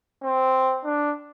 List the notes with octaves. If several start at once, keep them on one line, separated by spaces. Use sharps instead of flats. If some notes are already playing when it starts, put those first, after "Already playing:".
C4
D4